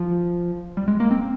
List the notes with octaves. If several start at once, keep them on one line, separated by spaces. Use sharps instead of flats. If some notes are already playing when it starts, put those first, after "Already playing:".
Already playing: F3
G3
G#3
A#3
C4